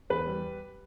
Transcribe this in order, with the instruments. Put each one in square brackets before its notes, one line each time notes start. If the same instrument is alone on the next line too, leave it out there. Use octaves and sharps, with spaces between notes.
[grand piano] E2 [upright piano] B4
[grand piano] G3